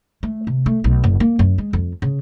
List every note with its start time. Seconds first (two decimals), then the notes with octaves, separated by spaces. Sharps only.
0.23 A3
0.47 C3
0.66 A3
0.84 B1
1.04 F#1
1.20 A#3
1.39 F#2
1.58 G#3
1.73 F2
2.02 C#3